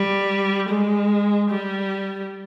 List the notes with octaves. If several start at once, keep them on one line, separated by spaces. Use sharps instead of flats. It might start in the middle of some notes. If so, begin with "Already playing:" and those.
Already playing: G3
G#3
G3